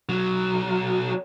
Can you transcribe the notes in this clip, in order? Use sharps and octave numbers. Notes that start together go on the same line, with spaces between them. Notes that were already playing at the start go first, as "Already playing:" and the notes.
B1 F#3